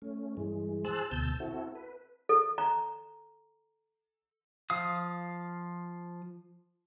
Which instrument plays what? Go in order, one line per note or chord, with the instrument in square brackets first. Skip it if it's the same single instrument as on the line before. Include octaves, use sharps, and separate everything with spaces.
[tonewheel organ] A3 C#4
G2 E3 G#3
G#4 C5 A5 E6 F#6
D2 B2 A5 E6 G6
C4 E4 F#4 A4
B4
[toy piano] A4
A#5
[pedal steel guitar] F3 F5 D#6